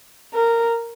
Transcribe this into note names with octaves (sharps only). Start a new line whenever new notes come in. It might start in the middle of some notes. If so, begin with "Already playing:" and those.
A#4